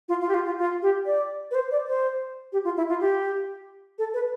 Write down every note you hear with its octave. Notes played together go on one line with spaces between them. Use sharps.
F4
F4
G4
F4
F4
F4
G4
D5
B4
C5
D5
C5
G4
F4
E4
F4
G4
A4
B4